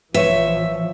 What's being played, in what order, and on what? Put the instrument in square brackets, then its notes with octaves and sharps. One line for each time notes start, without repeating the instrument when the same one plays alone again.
[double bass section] A#1 E3 F3 [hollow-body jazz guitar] B4 C#5 [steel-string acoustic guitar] E5